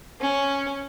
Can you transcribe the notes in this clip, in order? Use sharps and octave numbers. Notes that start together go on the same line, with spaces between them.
C#4